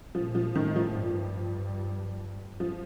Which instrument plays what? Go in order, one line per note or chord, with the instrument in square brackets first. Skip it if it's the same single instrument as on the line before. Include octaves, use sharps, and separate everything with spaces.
[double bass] A#2 [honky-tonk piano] F3
[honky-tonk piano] F3
[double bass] A2 [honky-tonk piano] D#3
[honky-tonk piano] F3
[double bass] G2
[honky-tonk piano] F3